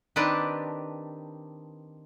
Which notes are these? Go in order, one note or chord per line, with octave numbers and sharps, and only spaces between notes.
D#3 C4 D4 G4 B4 A5